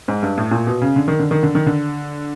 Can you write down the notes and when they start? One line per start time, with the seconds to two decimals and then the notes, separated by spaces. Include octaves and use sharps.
0.08 G#2
0.23 G2
0.38 A2
0.51 A#2
0.67 B2
0.81 C#3
0.96 D3
1.08 D#3
1.19 D3
1.31 D#3
1.43 D3
1.55 D#3
1.66 D3